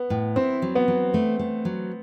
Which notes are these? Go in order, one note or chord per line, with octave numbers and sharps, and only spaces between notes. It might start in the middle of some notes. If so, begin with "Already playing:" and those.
Already playing: B3
A2
C4 E4
F#3
B3
F#3
A3
A3
F#3